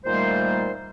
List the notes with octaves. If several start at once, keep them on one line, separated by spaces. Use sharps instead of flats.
A#2 D#3 G3 A3 A#3 C5